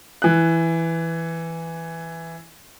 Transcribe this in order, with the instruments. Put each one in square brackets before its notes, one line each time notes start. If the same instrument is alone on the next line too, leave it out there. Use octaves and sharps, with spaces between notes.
[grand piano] E3 F#6